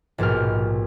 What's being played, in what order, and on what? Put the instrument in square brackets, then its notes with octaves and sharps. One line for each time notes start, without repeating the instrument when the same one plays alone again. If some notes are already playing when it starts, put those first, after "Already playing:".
[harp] A#1 G#2 B2 G4 F6